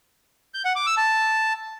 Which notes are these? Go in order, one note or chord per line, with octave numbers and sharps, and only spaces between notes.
G6
F#5
D6
E6
A5